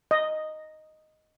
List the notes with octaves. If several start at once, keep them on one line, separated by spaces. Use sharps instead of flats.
D#5